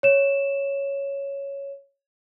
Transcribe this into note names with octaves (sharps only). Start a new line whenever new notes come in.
C#5 E7